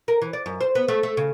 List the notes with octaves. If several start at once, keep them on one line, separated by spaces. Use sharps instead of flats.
A#4
E3
D5
F#2
C5
B3
A3
A3
C#3